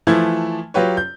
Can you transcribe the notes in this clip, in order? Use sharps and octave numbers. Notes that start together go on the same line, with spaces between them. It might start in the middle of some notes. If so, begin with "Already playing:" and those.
E3 F3 A3 E4 G#6
F#3 F4 G4 B4 C#5
G6